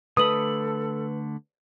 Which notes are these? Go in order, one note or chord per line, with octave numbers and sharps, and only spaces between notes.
D3 A3 A4 B4 B5 D#6 F#7